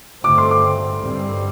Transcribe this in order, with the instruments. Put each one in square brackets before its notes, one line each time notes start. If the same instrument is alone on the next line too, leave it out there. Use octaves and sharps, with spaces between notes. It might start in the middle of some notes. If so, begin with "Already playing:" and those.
[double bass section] G2 D3 A3 C4 [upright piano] D6
[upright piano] C6
D6
[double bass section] G2 D3 G3 C4